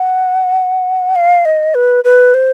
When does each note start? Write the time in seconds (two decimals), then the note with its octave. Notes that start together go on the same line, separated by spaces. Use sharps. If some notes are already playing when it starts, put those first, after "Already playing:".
Already playing: F#5
1.15 F5
1.45 D#5
1.75 B4
2.04 B4
2.34 C5